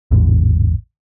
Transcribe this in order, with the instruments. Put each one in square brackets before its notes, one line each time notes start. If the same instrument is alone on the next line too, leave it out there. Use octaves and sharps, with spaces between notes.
[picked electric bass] A1 E2 G#2 D3